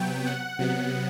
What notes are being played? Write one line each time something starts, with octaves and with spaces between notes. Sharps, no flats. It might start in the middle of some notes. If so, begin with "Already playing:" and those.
Already playing: C3 F#3 B3 G5
F#5
C3 F#3 B3